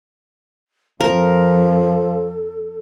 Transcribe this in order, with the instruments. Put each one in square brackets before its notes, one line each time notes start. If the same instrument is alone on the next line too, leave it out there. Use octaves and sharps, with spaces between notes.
[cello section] F2 [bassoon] F3 [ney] A4 [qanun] A#4